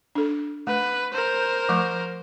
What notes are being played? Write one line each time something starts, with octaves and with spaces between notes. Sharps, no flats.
D4 A4
A3 B4
A#4 C5
F3 A3 C#6